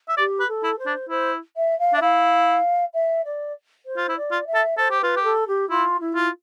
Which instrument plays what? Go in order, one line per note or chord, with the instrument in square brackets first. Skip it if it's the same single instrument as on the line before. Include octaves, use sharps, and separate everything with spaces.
[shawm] E5
[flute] G4 [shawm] D5
[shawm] B4
[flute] A4
[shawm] E4
[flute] C5
[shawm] D4
[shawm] E4 [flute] C5
[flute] E5
F5
[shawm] D4 [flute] E5
[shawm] E4 [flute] F5
[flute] E5
D5
C5
[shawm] F4
E4
[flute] D5
[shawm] F4
[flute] E5
[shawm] A4
[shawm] A4 [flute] C5
[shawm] G4
[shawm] F4 [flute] B4
[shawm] G4
[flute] A4
G4
[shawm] E4 [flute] F4
[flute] E4
[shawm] F4